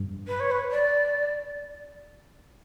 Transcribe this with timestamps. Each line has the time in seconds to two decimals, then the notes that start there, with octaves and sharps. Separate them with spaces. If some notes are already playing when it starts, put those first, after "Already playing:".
Already playing: G2
0.27 B4
0.40 C#5
0.51 B4
0.71 D5